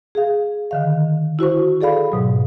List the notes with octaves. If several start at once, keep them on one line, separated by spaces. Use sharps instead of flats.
G#4 F5
D3 D#3 F5
E4 F#4 C5 C#6
G#4 A4 D5 F5 B5
G#2 B2 F#3